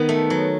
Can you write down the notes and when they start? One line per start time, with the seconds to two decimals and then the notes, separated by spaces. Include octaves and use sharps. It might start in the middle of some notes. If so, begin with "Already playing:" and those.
Already playing: D#3 B3
0.09 A3
0.30 F#3